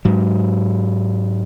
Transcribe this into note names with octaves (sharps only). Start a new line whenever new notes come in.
G#2 F#3